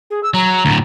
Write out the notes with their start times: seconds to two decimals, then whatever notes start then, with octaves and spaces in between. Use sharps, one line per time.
0.10 G#4
0.23 E6
0.34 F#3 A#5
0.65 D2 A2